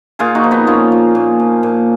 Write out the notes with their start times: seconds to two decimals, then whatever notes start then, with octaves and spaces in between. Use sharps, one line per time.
0.19 A#2 F4 G#4
0.35 D#4 F#4
0.44 F3
0.51 B3 D#4
0.67 A#2 C#4 F4
0.92 F3
1.15 A#2
1.40 F3
1.63 A#2